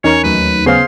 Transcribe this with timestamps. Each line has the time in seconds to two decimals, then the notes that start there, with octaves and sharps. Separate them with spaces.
0.04 E2 C#4 D#4 A#4 C#5 C#6
0.24 D#2 F#3 A3 B4
0.66 C#3 B3 C#4 G#4 C5 F5 C6